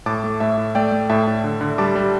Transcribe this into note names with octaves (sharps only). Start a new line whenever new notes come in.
A2 A5 D6
A3
A2 E5 A5
A2
A3 D5 G5
A3
A2 E5 A5
A2
D3
D3
G3 A5 D6
G3